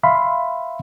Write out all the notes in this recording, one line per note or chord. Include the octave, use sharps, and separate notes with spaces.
E5 F5 B5 C6